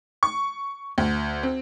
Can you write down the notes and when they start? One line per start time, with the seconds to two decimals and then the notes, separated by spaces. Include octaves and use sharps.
0.23 C#6
0.98 D2
1.43 C4